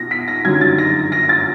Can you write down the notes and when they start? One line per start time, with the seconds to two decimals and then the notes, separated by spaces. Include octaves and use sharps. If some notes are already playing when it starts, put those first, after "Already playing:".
Already playing: B2 A#6
0.11 B6
0.28 A#6
0.45 G1 F#2 D#3 F#3 G#6
0.61 A6
0.78 A#6
1.12 A#6
1.29 A6